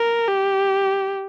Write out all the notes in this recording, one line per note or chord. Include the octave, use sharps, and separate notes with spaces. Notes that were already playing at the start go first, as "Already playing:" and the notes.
Already playing: A#4
G4